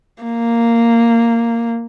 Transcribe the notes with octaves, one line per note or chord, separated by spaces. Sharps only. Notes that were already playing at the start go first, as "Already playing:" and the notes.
A#3